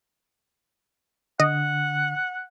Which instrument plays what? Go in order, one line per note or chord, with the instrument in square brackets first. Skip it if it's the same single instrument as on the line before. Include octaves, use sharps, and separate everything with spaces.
[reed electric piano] D3 [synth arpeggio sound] D#5 [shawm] F#5